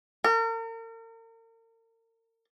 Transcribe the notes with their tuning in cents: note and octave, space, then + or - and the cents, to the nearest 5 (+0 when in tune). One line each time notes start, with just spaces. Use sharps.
A#4 -40